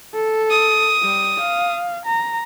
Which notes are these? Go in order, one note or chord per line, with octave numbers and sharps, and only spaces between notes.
A4
D#6
G3
F5
A#5